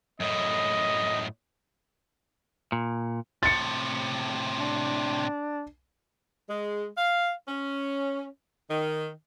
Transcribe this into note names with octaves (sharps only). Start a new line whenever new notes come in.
F#2 A2 D#5
A#2
A2 C3 A6 C#7
D4
G#3
F5
C#4
D#3